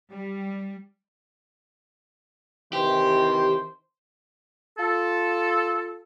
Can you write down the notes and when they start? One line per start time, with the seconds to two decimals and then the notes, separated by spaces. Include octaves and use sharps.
0.10 G3
2.73 C3 D#3 E3 G4 C5
4.79 F4 A4